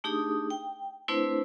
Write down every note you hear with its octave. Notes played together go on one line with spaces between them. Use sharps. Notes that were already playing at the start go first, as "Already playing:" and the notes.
A3 D4 D#4 G4 G#4 D#6
G5
A3 C4 D4 E4 B4 C5